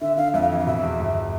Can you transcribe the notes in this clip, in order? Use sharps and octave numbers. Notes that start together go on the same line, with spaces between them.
D3 E5
D3 F5
F2 E5
F5
E3 E5
F5
B2 E5
E2
G1